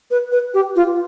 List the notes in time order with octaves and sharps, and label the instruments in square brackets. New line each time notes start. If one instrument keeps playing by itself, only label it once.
[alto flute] B4
B4
G4
F4